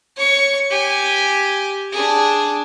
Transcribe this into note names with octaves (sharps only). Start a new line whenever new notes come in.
C#5 C#6
G4 G#5
D4 G#4